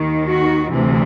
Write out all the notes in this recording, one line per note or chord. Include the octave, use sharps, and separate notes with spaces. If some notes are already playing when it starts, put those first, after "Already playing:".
Already playing: D#2 D#3
F#4
D2 C3 E3